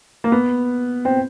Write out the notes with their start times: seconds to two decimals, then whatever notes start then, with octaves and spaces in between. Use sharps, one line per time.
0.24 A#3
0.32 B3
1.05 C4